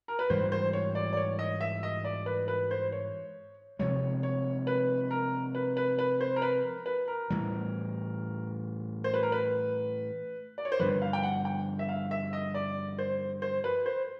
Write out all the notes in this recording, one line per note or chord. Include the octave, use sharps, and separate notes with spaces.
A#4
B4
G#2 E3 G3 C5
C5
C#5
D5
D5
C#5
D#5
E5
D#5
D5
B4
B4
C5
C#5
C3 F3 G#3 C#5
C#5
B4
A#4
B4
B4
B4
C5
A#4
B4
A#4
B4
A#4
A2 E3 G3
C5
B4
A#4
B4
D5
C#5
C5
G2 D3 F3 B4
F5
G5
F#5
G5
E5
F5
E5
D#5
D5
C5
C5
B4
C5